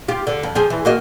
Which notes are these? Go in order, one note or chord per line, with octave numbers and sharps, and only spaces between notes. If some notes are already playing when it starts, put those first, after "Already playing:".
F4 G4
D3
F2
F3 G4 G#4
E3
A#3 F#4 D#5